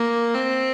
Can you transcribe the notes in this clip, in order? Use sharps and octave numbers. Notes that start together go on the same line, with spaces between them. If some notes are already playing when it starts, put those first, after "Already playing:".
Already playing: A#3
C4